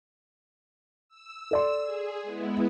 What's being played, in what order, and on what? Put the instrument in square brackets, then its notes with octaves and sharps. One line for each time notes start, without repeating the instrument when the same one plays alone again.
[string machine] E6
[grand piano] A4 D5 C6
[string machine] G#4
G#3 B3 E4